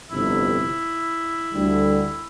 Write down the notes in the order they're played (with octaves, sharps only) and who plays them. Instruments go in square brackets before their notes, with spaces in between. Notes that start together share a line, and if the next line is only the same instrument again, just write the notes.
[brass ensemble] G1 F2 C3 [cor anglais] E4
[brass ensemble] D2 D3 G3